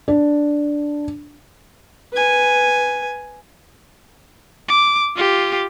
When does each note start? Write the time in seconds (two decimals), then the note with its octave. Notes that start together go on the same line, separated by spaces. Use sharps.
0.08 D4
2.13 B4 G#5
4.69 D6
5.16 F4 G4